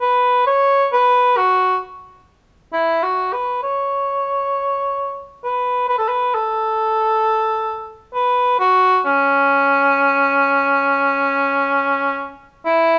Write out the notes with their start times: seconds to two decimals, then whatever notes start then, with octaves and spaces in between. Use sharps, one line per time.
0.01 B4
0.47 C#5
0.93 B4
1.37 F#4
2.73 E4
3.03 F#4
3.33 B4
3.63 C#5
5.44 B4
5.89 B4
5.98 A4
6.08 B4
6.34 A4
8.15 B4
8.60 F#4
9.06 C#4
12.66 E4